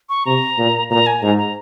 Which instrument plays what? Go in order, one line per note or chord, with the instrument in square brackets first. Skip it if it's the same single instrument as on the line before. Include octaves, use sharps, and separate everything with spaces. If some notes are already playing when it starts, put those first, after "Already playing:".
[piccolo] C#6
[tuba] C3 [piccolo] A#5
[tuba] A#2
[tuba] A#2 [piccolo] A#5
[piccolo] G#5
[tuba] G#2 [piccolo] A#5
[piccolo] A#5